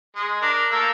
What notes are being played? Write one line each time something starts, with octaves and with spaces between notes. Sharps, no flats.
G#3
D4 A#4
A3 A#3 E6